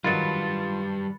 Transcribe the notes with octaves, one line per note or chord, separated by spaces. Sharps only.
D#3 F#3 G3 F4 B4 B5 A6 C#7